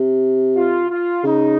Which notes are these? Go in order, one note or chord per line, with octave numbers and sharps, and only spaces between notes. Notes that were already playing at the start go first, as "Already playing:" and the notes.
Already playing: C3
F4
F4
C#3 D#4